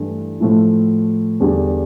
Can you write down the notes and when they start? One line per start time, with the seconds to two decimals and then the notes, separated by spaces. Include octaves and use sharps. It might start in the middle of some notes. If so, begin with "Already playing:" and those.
Already playing: G2 E3 A3 E4
0.40 A2 F3 A3 E4
1.40 E2 D3 G3 D4